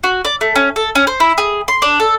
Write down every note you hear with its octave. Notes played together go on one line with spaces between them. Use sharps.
F#4
D5
A3
C#4
A4
C#4
C5
E4
G#4
C6
D4
A4